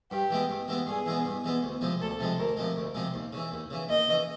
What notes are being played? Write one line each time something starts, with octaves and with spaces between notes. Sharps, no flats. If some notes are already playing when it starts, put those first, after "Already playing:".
G2 G4
E3 G#3 B3
G2
E3 G#3 B3
G2 G#4
E3 G#3 B3
G2
E3 G#3 B3
D2
C3 F3 G#3
D2 A4
C3 F3 G#3
D2 A#4
C3 F3 G#3
D2
C3 F3 G#3
D#2
C#3 E3
D#2
C#3 E3
D#2 D#5
C#3 E3